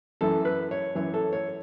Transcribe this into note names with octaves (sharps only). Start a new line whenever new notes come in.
F#2 E3 A4
B4
C#5
F#2 E3 C#5
A4
C#5